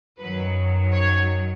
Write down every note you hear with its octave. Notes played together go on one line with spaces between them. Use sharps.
F#2 D#3 F#3 B4
C#5